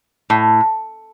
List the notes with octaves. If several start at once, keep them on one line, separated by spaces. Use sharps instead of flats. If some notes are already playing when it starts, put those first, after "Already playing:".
A2